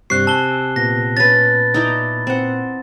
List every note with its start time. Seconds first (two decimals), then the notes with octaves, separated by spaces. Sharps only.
0.10 G2 C3 G3 C#6 F#6 C7
0.27 G#5 A5 E6 G7
0.76 A#2 B3 A#6
1.17 C#4 B4 A6
1.74 D#4 E4 D5
2.27 C4 F#5